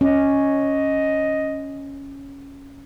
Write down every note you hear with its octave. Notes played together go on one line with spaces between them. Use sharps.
C#4 D#5